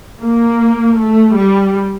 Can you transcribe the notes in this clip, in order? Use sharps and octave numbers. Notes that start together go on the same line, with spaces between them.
A#3
A3
G3